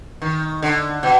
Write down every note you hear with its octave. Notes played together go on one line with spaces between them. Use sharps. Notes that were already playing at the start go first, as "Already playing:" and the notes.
D#3
D3
B2